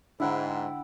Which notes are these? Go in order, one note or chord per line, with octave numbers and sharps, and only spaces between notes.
G#2 D3 E4 F#5 G5